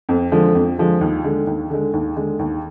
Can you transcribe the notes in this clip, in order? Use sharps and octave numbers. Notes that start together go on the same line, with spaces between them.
F2
D3 F3 G#3
F2
D3 F3 G#3
D#2
D3 G#3
D#2
D3 G#3
D#2
D3 G#3
D#2